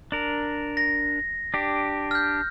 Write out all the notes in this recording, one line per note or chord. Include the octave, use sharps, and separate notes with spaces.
D4 A#4
A#6
D4 G4
F6 G6